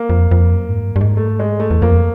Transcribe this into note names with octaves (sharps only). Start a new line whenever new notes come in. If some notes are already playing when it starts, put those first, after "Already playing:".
Already playing: A#3
F2
F2
F#2
G#2
G2
G2
G#2
A3
G#3
A3
E2
F2 A#3